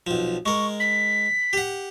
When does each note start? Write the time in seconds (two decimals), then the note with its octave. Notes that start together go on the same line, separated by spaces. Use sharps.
0.07 B1 F3
0.46 G#3 A#4 C#6
0.80 B6
1.53 G4 F#5